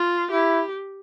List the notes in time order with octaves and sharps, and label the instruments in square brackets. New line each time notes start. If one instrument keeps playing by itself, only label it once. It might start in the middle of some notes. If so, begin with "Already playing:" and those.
Already playing: [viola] F4
[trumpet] E4 [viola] G4